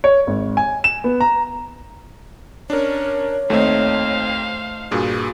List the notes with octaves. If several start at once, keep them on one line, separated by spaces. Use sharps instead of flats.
C#5
G#1
G#5
E7
B3
A#5
C#4 D4 A#4 C#5
D#2 A3 C4 D#4 C5 F5
G2 A#2 F#4 G#4